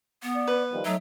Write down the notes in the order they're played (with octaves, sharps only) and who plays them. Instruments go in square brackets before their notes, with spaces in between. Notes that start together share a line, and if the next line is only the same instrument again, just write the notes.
[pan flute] B3
[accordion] D5
[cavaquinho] B4
[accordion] D#3 F3 G3
[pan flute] F#3 [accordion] A3 D#4 E5